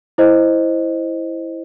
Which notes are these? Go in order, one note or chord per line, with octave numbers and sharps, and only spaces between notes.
E4 C5 D#5